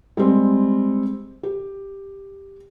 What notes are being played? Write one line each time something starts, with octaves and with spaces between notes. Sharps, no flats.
G3 G#3 C4
G4